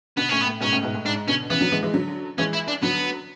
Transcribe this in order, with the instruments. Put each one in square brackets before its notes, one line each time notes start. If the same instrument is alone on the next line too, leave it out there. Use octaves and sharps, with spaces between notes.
[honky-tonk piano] B2 D3 [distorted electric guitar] B3
[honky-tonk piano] A2 C#3 [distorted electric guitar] C#4
[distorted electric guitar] B3
[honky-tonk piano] A2
[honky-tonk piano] G#2 B2 [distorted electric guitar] C#4
[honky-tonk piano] A2 C#3
G#2 B2
A2
[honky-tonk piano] G#2 [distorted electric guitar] D4
[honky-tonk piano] B2 D3 [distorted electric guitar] C#4
[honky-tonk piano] C#3 E3 [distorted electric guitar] B3
[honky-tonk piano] D3 F#3
E3 G#3
E3 G#3
D3 F#3
[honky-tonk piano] E3 G#3 [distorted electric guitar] C#4
[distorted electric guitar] E4
D4
[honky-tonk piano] D3 F#3 [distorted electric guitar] B3